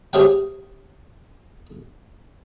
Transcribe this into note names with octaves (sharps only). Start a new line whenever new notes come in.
G4 G#4 C5 C#5 F5 G5